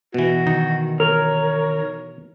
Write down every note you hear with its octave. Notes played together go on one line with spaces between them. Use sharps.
B2 E3 F#4
D#3
A#4 C#5